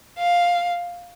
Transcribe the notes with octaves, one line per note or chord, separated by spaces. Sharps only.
F5